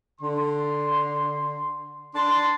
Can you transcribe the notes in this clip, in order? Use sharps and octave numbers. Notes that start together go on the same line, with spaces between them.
D3 C6
D4 A5 C6